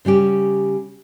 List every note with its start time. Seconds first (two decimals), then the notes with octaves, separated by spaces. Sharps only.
0.05 C#3 G3 C#4 G4